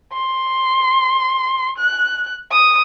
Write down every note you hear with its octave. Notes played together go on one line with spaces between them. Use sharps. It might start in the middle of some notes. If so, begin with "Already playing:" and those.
C6
F#6
D#6